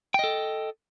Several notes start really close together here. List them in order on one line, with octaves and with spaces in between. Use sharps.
G5 D#5 A4